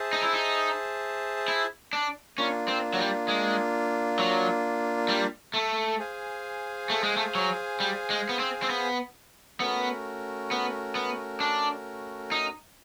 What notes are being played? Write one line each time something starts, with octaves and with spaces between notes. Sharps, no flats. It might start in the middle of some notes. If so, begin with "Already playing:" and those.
Already playing: G#4 C5 E5 A5
D#4
E4
D#4
E4
D4
A#3 C#4 D4 F4
C4
F#3
G3
G#3
F#3
G3
A3
G#4 C5 F5 G#5
A3
G#3
A3
F#3
G3
G#3
B3
C4
C4
B3
A3 B3 C#4 F#4 A#4
B3
B3
D4
D#4